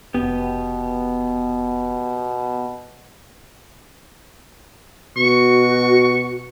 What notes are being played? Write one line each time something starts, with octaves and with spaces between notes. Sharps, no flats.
F1 B2 B3 G4
B2 F#4 C#6